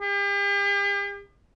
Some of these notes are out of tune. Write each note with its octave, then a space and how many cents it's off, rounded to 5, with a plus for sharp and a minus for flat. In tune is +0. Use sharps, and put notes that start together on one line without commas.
G4 +40